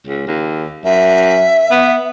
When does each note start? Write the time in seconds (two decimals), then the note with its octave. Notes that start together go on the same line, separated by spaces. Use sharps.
0.06 C#2
0.27 D#2
0.85 F#2 E5
1.71 B3